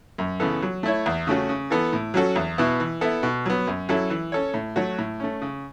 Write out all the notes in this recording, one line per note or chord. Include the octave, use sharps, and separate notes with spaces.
F#2
C#3 E3 B3 A4
F#3
A3 E4 C#5
E2
C#3 A3 C#4 F#4
C#3
E3 B3 A4
A2
F#3 C#4 F#4 A4
E2
B2 B3 E4
E3
B3 E4 A4
B2
F#3 B3
F#2
F#3 C#4 E4 A4
E3
C#4 A4 C#5
A2
F#3 A3 F#4 C#5
A2
A3 C#4
C#3